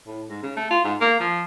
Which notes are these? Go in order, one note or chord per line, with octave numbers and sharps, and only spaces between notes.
A2
G#2
C#3
A3
F4
G#2
A#3
F3